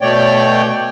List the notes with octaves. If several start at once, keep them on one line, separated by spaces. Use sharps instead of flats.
B2 A3 C#5 D5 G5